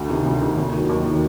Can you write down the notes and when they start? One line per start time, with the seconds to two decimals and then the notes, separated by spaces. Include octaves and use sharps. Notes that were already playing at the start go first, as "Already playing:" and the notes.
Already playing: D2
0.09 C3 D#3
0.26 D2
0.41 C3 D#3
0.57 D#2
0.73 D#3 F#3
0.89 D#2
1.05 D#3 F#3